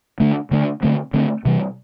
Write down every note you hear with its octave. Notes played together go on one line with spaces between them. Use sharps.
D3 A3 D4
D3 A3 D4
D3 A3 C4
D3 A3 C4
C3 E3 G3